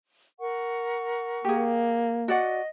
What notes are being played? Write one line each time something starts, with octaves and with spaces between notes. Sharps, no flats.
A#4 F#5 C#6
A#3 G4 G#4
F#4 D5 D#5 F#5